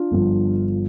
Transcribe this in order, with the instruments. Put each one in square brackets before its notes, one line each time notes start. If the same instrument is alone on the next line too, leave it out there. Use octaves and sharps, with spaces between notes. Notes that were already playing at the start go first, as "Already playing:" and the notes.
Already playing: [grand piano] D4 F4
G1 G2 F3